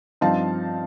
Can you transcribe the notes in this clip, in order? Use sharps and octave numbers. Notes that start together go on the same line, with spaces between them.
G2 F3 C4 D#4 F5 A5